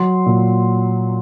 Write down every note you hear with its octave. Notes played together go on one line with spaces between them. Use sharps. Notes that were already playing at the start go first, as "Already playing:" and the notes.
Already playing: F#3 C6
A#2